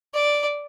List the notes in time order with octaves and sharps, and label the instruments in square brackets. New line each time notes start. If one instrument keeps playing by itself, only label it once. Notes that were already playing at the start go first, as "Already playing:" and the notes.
[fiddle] D5